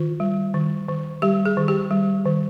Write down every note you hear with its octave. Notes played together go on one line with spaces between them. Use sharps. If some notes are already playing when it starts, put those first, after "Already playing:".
Already playing: D#3 F4
G3
D#3
D#3
G3 G4
G#4
D#3
G4
G3
D#3